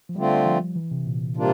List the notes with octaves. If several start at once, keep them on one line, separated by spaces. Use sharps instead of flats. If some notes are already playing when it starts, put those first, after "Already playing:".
F3
D3 G3 A3 C4 F4
F3
E3
C3
A#2
C3 G3 A#3 D4 F4